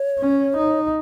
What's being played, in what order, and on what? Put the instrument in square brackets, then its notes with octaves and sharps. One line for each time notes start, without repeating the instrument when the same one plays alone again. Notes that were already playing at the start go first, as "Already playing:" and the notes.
Already playing: [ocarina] C#5
[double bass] C#4
D#4